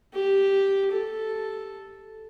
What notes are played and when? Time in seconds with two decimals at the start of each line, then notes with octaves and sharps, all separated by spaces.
0.14 G4
0.91 A4